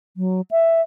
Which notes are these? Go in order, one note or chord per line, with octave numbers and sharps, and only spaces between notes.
F#3
E5